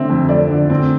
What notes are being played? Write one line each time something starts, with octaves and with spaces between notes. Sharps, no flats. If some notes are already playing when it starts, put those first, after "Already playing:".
Already playing: D3 C4 E5
F2
A3 D5
D3
C4